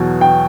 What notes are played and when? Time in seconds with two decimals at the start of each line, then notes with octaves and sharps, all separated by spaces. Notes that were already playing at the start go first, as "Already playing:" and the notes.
Already playing: E2 B2 F#3
0.21 G5